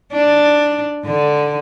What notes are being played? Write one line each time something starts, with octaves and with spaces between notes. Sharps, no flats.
D4
D3